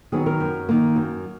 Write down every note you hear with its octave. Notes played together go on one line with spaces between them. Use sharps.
D#3 F#3 B3 G#4
A#4
F#2
D#3 A#3
F#2